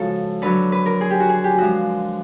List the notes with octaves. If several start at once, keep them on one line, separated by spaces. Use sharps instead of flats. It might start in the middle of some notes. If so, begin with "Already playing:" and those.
Already playing: C#3 F3 G#3 F#4 A4
D3 F#3 B4
B4
A#4
G#4
G4
F#4
G#4
G4
D3 F3 G#3 F#4